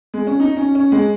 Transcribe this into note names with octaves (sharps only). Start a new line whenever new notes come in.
G#3
C#4
D#4
C#4
C#4
G#3